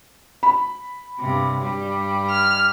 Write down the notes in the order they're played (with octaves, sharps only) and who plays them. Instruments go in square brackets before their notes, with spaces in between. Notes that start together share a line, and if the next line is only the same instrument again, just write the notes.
[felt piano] B5
[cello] G2 C3
G2 G3
[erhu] F6